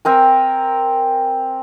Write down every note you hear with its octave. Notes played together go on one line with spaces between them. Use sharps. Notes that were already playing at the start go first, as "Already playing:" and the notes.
C4 A#4 G#5